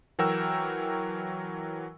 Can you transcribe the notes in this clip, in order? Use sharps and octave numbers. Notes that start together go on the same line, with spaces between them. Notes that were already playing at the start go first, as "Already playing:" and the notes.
E3 F#3 F#4 A#4 G5 E6